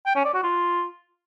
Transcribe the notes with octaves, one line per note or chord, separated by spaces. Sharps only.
G5
C#4
D5
F#4
F4